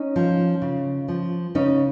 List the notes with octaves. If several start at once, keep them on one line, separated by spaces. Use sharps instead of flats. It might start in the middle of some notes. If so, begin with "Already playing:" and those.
Already playing: C#4 D#4
F3
C#3
F3
C#3 C#4 D#4